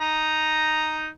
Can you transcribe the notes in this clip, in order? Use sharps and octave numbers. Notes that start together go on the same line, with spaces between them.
D#4 A#5